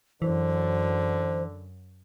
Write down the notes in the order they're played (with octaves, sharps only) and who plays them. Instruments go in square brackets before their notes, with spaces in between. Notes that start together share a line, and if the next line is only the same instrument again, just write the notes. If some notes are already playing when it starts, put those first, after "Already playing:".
[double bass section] F#2 [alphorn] D3 [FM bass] E3 [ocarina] C5